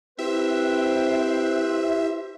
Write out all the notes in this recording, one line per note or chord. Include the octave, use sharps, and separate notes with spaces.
C4 E4 G4 B4 C5 E5